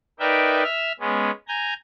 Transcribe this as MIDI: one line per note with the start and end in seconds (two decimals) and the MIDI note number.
0.20 0.63 63
0.20 0.63 70
0.20 0.63 71
0.20 0.63 74
0.20 0.63 76
0.20 0.63 79
0.64 0.92 76
0.64 0.92 88
0.64 0.92 89
1.00 1.31 56
1.00 1.31 59
1.00 1.31 61
1.48 1.74 80
1.48 1.74 82
1.48 1.74 91